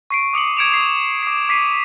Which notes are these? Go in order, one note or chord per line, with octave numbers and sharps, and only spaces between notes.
C#6 C7 D7
D6 D#6 C#7 F#7
D6 G#6 C#7 D7 E7 F7
C7
D6 C7
D6 B6 C7 D#7